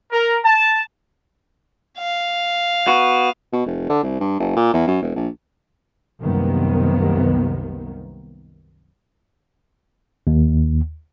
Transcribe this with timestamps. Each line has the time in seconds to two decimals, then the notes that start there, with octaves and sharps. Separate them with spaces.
0.12 A#4
0.44 A5
1.98 F5
2.87 B3 F#4
3.53 B2
3.66 F1
3.89 D3
4.03 C2
4.20 G2
4.40 F#1
4.57 A#2
4.73 E2
4.87 F#2
5.02 E1
5.16 A#1
6.21 C2 F#2 C3 D#3 A#3 B3
10.27 D#2